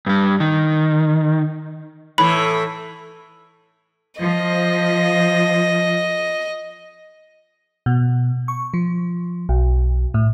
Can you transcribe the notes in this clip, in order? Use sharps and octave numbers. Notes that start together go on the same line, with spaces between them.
G2 G3
D#3
A2 E3 B5
F3 D#5
B2
C#6
F3
B1
A2